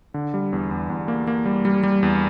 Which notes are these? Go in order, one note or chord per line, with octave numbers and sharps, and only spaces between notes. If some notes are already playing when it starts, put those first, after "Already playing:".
D3
G3
E2
E2
E2
A#3
A#3
G3
G3
G3
E2